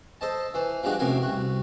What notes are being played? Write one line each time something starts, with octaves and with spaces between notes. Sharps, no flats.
A4 C5 D#5 A5
E3 C5
F3 G3 G#3 D4 F#4
A1 F#2 C3 A#4 F5 G#5
C2 F#4